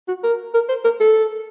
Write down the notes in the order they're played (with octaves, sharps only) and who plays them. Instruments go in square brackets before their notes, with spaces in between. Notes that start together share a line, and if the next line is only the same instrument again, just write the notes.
[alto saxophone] F#4
A#4
A#4
C5
A#4
A4